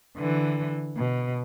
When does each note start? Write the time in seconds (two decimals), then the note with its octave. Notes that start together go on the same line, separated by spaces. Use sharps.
0.17 D3 E3
0.97 B2